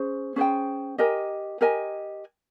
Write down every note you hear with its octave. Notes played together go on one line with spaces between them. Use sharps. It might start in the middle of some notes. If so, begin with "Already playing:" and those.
Already playing: C#4 G#4 C5
C#4 G#4 C5 G5
G4 A#4 D#5 G#5
G4 A#4 D#5 G#5